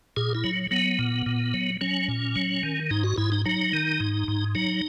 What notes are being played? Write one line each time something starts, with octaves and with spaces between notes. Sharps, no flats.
A#2 G#4
E4
F#3
F#3 B3
A#2
A#2
F#3
F#3 C#4
A#2
F#3
D#3
G#2 D#4
F#4
G#2 E4
D#4
F#3 D#4
D#3
G#2
G#2
F#3 D#4